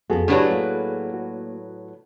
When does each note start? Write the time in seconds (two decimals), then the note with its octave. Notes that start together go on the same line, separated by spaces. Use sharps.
0.10 F2 B3 F#4 G#4 A4
0.28 A2 F#3 C#4 D4 G4 B4
0.51 A#3
1.14 F#4